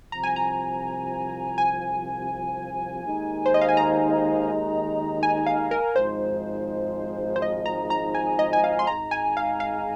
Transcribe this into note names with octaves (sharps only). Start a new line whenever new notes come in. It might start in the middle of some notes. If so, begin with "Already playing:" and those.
C2 C3 F3 A#5
G#5
A#5
G#5
D#2 D#3 G#3 D#4
C5
D#5
F5
G#5
A#5
G#5
F5
A#4
G#1 G#2 F3 G#3 D#4 C5
C5
D#5
A#5
A#5
G#5
D#5
G#5
F5
C6
G#1 G#2 G#3 D#4 G#4 A#5
G#5
F5
F5